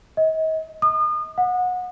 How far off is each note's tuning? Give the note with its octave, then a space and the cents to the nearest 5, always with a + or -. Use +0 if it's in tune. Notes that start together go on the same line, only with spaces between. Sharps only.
D#5 +35
D#6 -35
F#5 -25